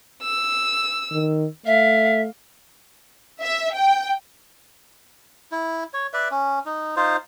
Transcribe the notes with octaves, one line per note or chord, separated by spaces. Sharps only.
E6
D#3
A3 E5 F5
E5
G5
E4
C#5
B4 D5 E5
C#4
D#4
D#4 F4 C5